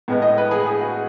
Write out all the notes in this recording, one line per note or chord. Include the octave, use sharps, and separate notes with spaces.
A2 G#3 B3
D#5
B4
G#4
G#4
F#4